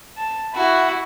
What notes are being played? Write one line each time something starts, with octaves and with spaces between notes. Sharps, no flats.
A5
E4 F#4